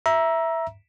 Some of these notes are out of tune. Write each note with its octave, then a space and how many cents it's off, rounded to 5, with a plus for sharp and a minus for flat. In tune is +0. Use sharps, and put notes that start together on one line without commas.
E5 +0 A#5 +20